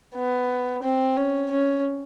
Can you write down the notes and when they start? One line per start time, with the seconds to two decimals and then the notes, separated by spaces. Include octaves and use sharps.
0.15 B3
0.83 C4
1.17 C#4
1.51 C#4